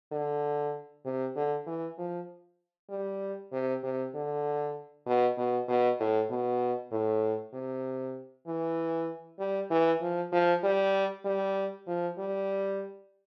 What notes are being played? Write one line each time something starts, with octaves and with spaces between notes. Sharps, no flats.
D3
C3
D3
E3
F3
G3
C3
C3
D3
B2
B2
B2
A2
B2
A2
C3
E3
G3
E3
F3
F3
G3
G3
F3
G3